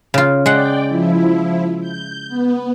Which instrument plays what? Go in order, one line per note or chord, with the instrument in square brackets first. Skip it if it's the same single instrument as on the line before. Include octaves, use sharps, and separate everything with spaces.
[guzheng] C#3 F4
[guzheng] G#3 F#5 [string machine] D5 G5
[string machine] F3 E4
G6
B3